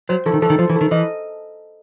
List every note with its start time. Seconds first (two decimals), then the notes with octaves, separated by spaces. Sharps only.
0.09 F#3 C5
0.26 E3 A4
0.33 D#3
0.42 E3 A4
0.50 D#3
0.59 F3 C5
0.70 E3
0.76 A4
0.81 D#3
0.91 E3 D#5